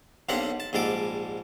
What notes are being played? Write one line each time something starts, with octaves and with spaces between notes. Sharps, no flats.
B1 A#3 C4 D4 G4 F#5
A5
A#1 G#2 G3 A4 D6